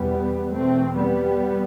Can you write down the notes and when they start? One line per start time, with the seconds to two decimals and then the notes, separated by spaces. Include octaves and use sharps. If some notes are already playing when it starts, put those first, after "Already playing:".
Already playing: E2 B2 G3 B3
0.50 E2 B2 A3 C4
0.94 G3 B3